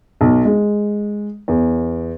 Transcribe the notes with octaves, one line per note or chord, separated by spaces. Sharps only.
B1
G#3
E2